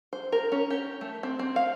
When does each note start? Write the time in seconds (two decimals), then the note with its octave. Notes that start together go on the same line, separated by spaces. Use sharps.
0.13 C5
0.32 A#4
0.52 C#4
0.70 G4
1.01 A3
1.23 C4
1.39 C4
1.56 F5